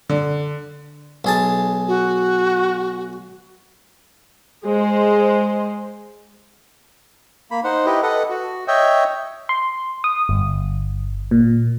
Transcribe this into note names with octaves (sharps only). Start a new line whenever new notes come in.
D3
B1 G#4 A5
F#4
G#3 C5
A#3 B5
D#4 C5 F#5
E4 G4 B4 D#5
A4 B4 D#5 F#5
F#4
C#5 D#5 E5 G5
C6
D#6
G1
A#2